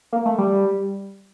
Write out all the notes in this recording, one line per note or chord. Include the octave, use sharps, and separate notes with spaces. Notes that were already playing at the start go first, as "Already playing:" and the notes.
A#3
A3
G3